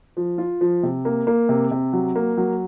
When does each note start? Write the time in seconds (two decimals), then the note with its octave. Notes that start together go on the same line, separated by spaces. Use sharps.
0.17 F3
0.38 F4
0.61 F3
0.83 C3
1.05 A#3
1.27 A#3
1.49 C3
1.71 C3
1.93 F#3
2.16 A#3
2.37 F#3